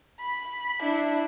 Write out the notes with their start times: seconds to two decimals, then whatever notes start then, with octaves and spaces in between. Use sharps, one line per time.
0.21 B5
0.82 D4 E4